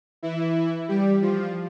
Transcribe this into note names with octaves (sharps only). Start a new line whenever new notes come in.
E3 E4
G3 G4
F3 F4